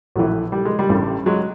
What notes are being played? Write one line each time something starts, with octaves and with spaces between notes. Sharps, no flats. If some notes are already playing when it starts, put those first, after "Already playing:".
A#1 A2 E3 F#3
G3
G#3
G3
A1 G2 E3
F#3 G#3